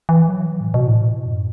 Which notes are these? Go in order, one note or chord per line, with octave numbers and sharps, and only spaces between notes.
E3
F#3
E3
A2
B2
A2
F#2